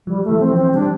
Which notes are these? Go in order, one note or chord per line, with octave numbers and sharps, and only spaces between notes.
F3 G3
E3 A3
C4
F3
C4
E3 G3 D4